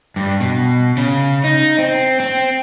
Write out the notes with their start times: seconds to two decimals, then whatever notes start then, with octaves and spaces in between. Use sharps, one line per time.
0.16 G2
0.40 B2
0.97 C#3
1.44 D#4
1.79 C4
2.20 C4